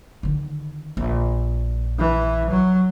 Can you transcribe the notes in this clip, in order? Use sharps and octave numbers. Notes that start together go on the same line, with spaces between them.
D3 D#3
A#1
E3
F#3